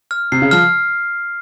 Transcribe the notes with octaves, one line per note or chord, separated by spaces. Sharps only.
F6
C3 C7
C#3
F3 F6